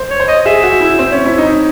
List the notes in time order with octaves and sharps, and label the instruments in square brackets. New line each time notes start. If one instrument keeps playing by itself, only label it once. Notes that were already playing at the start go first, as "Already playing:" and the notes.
Already playing: [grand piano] C5
[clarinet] C#5
[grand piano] C5
[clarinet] D#5
[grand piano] G#4 [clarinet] E5
[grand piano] F#4
E4
C4
C#4
E4
D#4